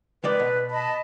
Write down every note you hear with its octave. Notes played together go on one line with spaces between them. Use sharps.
D#3 G#3 B4 D5
B2
D#5 A5 B5